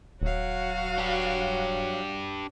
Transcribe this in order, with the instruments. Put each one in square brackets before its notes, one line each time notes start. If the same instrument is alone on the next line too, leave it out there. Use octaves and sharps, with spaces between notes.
[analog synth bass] D#1 [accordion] F#3 [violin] F#4 F5
[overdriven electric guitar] D4 G4